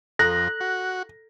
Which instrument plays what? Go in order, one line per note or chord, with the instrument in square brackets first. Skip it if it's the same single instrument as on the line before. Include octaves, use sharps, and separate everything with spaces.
[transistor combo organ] F2 [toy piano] A4 A#5 [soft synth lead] F#6 [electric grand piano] A#6
[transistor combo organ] F#4